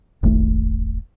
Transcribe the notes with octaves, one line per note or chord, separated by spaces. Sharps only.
D#1 G#1 A3